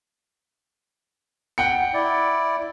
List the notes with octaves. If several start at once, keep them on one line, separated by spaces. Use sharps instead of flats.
F#5 G5 C#7
E4 D5